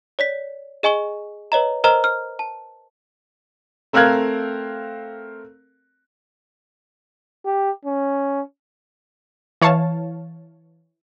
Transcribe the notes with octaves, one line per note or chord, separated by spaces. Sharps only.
C#5 D5 B6
G#4 D#5 G#5 C#6 G7
B4 C#5 D#5 A#5
A#4 C5 D#5 A#5 F6
F6
A5
A3 C4 A#4 F5 F#6 G#6
G4
C#4
E3 C#5 F5 A5